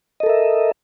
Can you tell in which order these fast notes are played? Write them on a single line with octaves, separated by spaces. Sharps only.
D#5 A4 A#4 E5